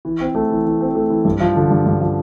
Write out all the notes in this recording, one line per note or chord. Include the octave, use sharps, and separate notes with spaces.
E3
C4
A3
E3
E3
C4
A3
E3
G2
F3
D3
G2
G2
F3